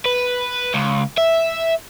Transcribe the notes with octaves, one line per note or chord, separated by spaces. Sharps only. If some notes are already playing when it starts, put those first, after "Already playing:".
B4
C#2
E5